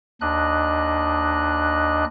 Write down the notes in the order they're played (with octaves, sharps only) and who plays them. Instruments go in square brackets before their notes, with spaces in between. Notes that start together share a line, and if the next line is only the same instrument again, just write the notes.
[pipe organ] D#2 D4 D#5 F#6